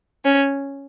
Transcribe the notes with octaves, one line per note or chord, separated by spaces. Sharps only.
C#4